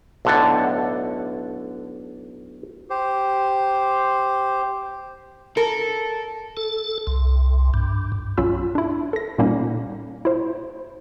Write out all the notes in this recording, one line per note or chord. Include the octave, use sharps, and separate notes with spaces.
B1 A2 D3 F#5 A5
G4 C5
A4 A#4
A4
C2
G2
B1 C#4 F4 B5 E6
D4 E4
A4 A#6
A#2 G3 A#3 C#4 D#4
E4 C5